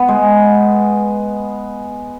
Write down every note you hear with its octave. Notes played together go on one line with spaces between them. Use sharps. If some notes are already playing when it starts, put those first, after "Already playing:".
Already playing: B3
G#3